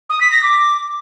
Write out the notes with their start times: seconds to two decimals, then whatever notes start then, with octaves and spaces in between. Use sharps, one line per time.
0.09 D#6
0.20 B6
0.31 A#6
0.42 D6